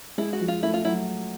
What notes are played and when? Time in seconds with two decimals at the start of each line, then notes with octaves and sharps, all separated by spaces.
0.18 G#3 E4
0.33 F#4
0.41 F3
0.48 F4
0.63 A3 E4
0.74 F4
0.85 F#3 E4